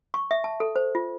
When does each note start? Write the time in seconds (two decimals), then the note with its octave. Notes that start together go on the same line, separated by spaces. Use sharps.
0.14 C#6
0.31 E5
0.44 A5
0.60 A4
0.76 C5
0.95 F4